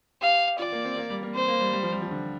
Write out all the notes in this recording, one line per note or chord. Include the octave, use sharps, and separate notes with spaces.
G4 F5
F4 D5
A#3
C4
A#3
G3
A#3
C4 C5
A#3
G3
G3
F3
G3
F3
D3